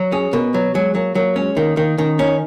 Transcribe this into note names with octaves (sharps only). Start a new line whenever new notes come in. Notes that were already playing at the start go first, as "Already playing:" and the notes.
Already playing: F#3
C#4 G#4
B2 A#4
F#3 B3
F#3 G#3
F#3 A#3
F#3 A#3
G#3 C#4
D#3 A#3
D#3 A#3
D#3 C#4
C#4 D#4